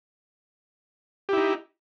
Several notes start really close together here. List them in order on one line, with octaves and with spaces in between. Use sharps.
G4 E4 D#4